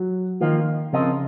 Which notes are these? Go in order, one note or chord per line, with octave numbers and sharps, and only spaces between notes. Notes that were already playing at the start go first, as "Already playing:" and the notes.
Already playing: F#3
D#3 F3 A#3 F4
C#3 F3 C4 F4 A#4 D#5